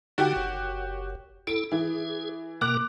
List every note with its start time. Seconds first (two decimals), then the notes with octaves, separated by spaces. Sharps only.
0.18 D3 D#4 F#4 G4
0.36 F#1
1.47 E4 A4 D7
1.72 E3 G#4
2.61 B2 A#3 A#4 D6 F#6